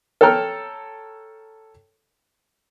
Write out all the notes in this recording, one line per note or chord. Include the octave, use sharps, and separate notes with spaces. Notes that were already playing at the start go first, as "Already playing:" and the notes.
A4 C#5 G5 A#5 F6